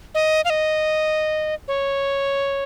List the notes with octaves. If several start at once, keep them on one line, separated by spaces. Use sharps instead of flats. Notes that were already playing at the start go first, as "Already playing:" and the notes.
D#5
F5
D#5
C#5